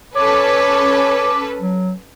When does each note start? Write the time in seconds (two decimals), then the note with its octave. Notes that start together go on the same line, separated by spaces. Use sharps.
0.15 C#4 A4 B4 C#5 D6
1.60 F#3